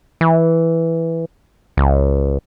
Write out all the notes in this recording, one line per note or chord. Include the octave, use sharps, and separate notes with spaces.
E3
C#2